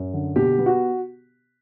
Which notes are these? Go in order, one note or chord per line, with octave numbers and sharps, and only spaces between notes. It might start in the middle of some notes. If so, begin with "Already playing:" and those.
Already playing: F#2
D3
B2 G4
B3
F#4